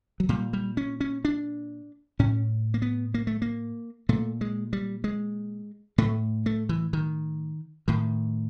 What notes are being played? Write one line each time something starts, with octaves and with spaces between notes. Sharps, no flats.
F#3
A#2 G3
G3
C#4
C#4
D4
A2 C#4
A#3
B3
A#3
A3
A#3
A#2 A3
G#3
G3
G#3
A2 A3
A3
E3
D#3
A2 D#3